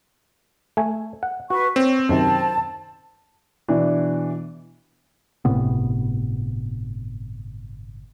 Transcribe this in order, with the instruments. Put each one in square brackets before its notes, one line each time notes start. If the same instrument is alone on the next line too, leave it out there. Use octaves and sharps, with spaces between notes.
[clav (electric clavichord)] A3 G#5
F#5
[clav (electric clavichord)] F#4 [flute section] B4 C#6
[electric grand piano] C4 [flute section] C#5
[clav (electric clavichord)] F#2 C3 D#3 [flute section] A5
[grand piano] B2 E3 D4
[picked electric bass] G1 A2 C3 B3